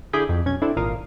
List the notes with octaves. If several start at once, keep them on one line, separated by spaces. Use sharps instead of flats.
D3 E4 G#4 B5 D6 G6
F2
B1 C#4 G#6
C4 D4 E4 A4
G#1 A#2 A#4 F5 D#6